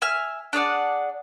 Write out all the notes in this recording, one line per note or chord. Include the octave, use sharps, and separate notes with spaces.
E5 G#5 F6
D4 G#4 D5 F#5